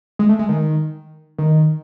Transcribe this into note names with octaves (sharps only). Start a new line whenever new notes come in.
G#3
A3
G#3
D#3
D#3